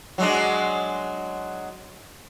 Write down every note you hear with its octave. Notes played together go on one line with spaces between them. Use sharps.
F#3 G#3 D4